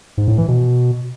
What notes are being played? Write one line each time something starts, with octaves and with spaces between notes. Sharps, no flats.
G#2
A2
E3
B2